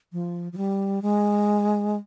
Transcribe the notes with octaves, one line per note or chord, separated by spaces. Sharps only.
F3
F3
G3
G#3